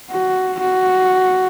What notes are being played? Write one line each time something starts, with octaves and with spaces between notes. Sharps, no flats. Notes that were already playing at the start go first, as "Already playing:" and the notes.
F#4
F#4